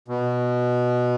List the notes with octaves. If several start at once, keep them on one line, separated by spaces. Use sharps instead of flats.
B2